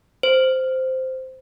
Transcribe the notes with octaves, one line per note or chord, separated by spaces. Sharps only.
C5